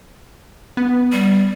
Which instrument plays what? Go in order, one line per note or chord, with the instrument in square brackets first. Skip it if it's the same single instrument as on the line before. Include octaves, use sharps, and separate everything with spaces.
[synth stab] B3
[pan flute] G3